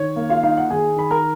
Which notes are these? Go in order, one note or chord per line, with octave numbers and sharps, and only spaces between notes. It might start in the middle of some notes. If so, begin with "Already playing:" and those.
Already playing: D#3 C#5
A#3
F4 F5
D#4 F5
F#5
D#3 G#4 G#5
D#3 B5
A#4 A#5